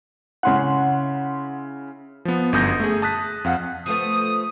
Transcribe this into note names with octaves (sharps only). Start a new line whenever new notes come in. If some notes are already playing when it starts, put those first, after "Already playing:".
C#3 C#4 E4 F#5 C6
F3 B3
G1 F#2 D#6 G6 A#6
A3 G#4
A5 D#6 F#6 B6
F2 F5 F#5
F3 A3 B3 D#6